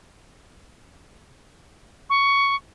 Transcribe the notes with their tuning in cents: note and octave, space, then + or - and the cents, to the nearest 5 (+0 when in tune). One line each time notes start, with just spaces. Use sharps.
C#6 +10